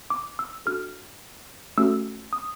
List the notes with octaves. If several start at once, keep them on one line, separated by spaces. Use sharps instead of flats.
D6
E6
D4 F#4 A4 F6
A3 C#4 F#4 A4 E6
D#6